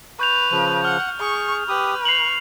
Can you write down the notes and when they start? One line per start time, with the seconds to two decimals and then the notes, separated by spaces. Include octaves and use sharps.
0.19 B4 C#6 G6 F7
0.51 C#3 F3
0.85 F#5 F6
1.20 G#4 C#6
1.68 G4 B4 D#6
2.05 C#6 C7 F7 F#7